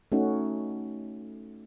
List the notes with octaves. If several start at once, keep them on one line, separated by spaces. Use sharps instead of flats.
A3 C#4 D#4 F#4